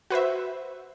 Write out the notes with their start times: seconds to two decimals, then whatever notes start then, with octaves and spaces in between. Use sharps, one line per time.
0.10 F#4 B4 C5 E5